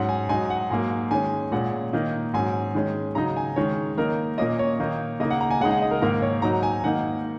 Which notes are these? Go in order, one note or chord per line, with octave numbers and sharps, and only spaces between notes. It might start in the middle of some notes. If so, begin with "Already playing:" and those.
Already playing: G#2 F#3 C#4 F#5
G#5
G#2 F#3 D#4 G#5
F#5
G#2 F#3 A#3 G#5
D#3 G#3 C#4 G#5
A#2 G#3 C#4 F#5
D#3 A#3 D#4
G#2 F#3 C#4 G#5
D#3 G#3 C#4
C#3 F#3 D#4 A#5
G#5
D#3 G#3 C#4 C#5
D#3 A#3 D#4 A#4
A#2 A#3 C#4 D#5
C#5
D#3 A#3 D#4
C#3 A#3 D#4 D#5
F#5
A#5
G#5
C#3 G#3 D#4 F#5
F#5
D#5
A#4
G#2 D#3 A#3 A#4
C#5
G#2 F#3 D#4 A#5
G#5
G#2 D#3 A#3 D#4 F#5